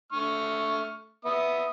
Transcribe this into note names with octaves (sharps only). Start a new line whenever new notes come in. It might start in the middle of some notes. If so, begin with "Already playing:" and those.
A3 C#6 F6
B3 E5 D#6